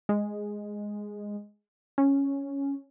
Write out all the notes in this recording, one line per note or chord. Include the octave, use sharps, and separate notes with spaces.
G#3
C#4